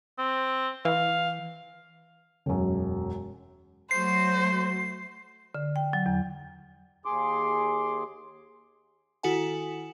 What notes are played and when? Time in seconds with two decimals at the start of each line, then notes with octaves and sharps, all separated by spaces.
0.18 C4
0.85 E3 F5
2.46 E1 F#2
3.91 F#3 A3 F#4 C5 C7
5.54 D3
5.76 G5
5.93 F#3
6.06 E2
7.05 D#2 G#4 C6 D6
9.23 D#3 E4 F#4 A4 F#5 G#5